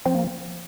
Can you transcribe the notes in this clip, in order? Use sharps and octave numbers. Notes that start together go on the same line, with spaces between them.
F3 C4
A#3